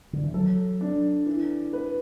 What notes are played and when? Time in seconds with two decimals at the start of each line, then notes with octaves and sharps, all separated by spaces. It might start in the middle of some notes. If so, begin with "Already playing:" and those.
0.13 D3
0.23 E3
0.34 F#3 A4
0.81 D4
1.26 E3
1.73 B4